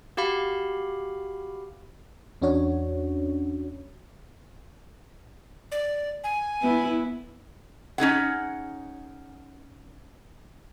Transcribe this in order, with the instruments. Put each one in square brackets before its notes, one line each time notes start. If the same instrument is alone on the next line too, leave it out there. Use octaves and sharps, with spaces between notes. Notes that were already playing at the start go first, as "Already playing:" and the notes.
[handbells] F#4 G4 F5 B5
[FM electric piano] E2 C#4 D4 F#4 C#5
[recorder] D5
G#5
[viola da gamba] B3 E4
[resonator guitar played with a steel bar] C#4 D#4 G#4 F#5